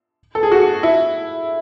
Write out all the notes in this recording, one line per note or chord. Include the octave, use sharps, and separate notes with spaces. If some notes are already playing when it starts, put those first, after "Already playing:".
A4
G#4
F#4
E4